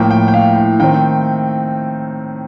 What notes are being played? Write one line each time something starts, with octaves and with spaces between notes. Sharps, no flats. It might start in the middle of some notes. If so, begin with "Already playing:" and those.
Already playing: A2 F3 A#3 G5
G5
G5
F5
G5
D#3 A3 C4 G5